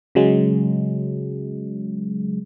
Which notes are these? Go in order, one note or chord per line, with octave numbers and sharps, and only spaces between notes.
C#3 F#3 G#3